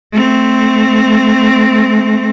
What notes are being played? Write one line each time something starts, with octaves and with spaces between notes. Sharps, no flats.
A3 C4